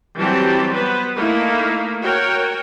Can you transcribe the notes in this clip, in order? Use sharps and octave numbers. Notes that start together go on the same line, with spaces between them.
E3 F#3 G3 C4 G4 A5
B3 B4 C5
A3 A#3 D#4 E4 A#4
F#4 A#4 C#5 G5